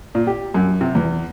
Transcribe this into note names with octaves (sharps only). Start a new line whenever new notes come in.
A#2
G4
F#2
C3
E2